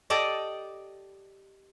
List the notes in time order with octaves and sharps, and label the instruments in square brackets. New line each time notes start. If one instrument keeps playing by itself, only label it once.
[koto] G4 A4 D5 D#5